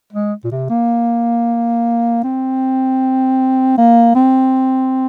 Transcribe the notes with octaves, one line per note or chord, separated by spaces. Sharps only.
G#3
A#2
C3
A#3
C4
A#3
C4